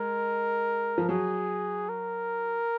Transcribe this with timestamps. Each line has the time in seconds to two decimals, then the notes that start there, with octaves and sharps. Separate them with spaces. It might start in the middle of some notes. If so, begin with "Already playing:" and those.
Already playing: G#3 A#4
0.98 F3
1.09 F#3 G#4
1.89 A#4